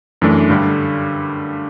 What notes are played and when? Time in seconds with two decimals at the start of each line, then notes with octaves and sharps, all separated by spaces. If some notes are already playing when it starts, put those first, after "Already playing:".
0.22 F#2 E3 A3 D4
0.50 G2 D3 G3